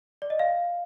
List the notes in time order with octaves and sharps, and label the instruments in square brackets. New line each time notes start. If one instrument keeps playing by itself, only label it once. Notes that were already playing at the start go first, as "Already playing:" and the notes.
[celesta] D5
D#5
F5